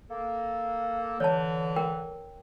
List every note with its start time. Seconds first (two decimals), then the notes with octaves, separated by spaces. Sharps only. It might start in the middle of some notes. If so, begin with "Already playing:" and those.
0.11 A#3 A4
1.20 D3 E3 C#5 A5
1.76 A#4 G5